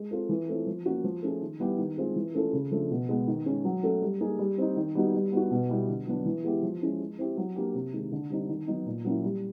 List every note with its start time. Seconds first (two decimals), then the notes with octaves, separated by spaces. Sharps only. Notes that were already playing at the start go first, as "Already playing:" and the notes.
Already playing: G#3
0.11 C4 F4 A4
0.29 E3
0.49 A3 C4 F4
0.66 F3
0.86 A#3 C#4 F#4
1.04 F3
1.22 A3 C#4 F4 G#4
1.41 D#3
1.60 G3 B3 E4 G4
1.78 D#3
1.97 G#3 C4 F4 G#4
2.16 E3
2.34 A3 C#4 F4 A4
2.53 C#3
2.71 F3 A3 D4
2.90 B2
3.09 G#3 B3
3.27 D#3
3.46 G#3 C#4
3.65 F#3
3.83 A3 C#4 F#4 A4
4.02 G3
4.21 A#3 D#4 G#4
4.39 G3
4.58 C4 D#4
4.76 D#3
4.95 G3 B3 D#4 F#4
5.14 G3
5.32 B3 D#4 F#4
5.51 B2
5.69 G3 B3 E4 G4
5.88 D3
6.07 F#3 B3 D4
6.25 E3
6.44 G#3 B3 E4 G4
6.63 F3
6.81 G#3 C#4 E4
7.00 G#3
7.18 C4 E4 G4
7.37 F#3
7.56 A#3 D4 G4
7.74 C3
7.93 D#3 G#3
8.12 D3
8.30 G3 C4 D#4
8.49 D#3
8.67 F#3 B3 D#4
8.86 A#2
9.04 F#3 A#3 C#4 E4
9.23 G3